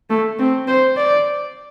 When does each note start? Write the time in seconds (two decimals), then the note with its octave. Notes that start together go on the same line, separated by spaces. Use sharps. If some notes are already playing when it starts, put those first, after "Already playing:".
0.10 A3
0.39 C4
0.68 C5
0.97 D5